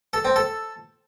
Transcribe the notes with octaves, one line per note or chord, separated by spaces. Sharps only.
A4
C4
A4